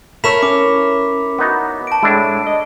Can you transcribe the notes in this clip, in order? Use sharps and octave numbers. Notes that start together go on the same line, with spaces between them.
A3 E4 A#4 C#5 B5 B6 E7
C#4 D6
B3 D#4 F#4
A5 D7
A2 G#3 D4 E4
D#5